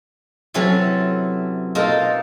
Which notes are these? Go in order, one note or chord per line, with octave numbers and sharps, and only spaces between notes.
C3 E3 F#3 C#4 A4
B2 A#3 D#4 F4 A4